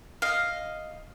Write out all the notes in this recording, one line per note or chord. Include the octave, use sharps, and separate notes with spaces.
D#5 F5